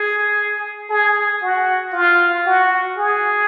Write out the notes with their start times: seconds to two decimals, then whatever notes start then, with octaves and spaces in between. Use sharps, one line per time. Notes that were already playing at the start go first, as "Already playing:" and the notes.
Already playing: G#4
0.90 G#4
1.42 F#4
1.93 F4
2.45 F#4
2.97 G#4